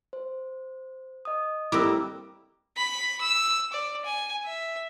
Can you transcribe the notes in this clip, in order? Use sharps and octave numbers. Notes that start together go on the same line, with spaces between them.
C5
D#5 D#6
G3 A#3 C4 E4 D6 E6 F#6 A#6
B5
E6
D5
G#5
E5